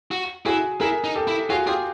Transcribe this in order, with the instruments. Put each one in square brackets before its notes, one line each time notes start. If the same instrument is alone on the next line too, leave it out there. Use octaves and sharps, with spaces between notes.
[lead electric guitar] F#4
[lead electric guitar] E4 [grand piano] F#4 G#4
[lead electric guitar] E4 [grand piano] G#4 A#4
[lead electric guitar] D#4
[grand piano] G4 A4
[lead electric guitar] E4
[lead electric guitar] F4 [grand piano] F#4 G#4
[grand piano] F4 G4 [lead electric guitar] G#4